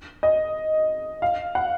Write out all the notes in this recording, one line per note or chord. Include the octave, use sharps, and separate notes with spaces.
D#5
F5
F#5